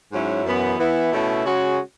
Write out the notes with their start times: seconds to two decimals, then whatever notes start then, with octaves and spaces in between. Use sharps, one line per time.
0.11 G#2 F#3 C#4 E4
0.45 F#2 E3 B3
0.79 E3 B3 E4
1.12 B2 A3 C#4 E4
1.44 C#3 G#3 C#4 F#4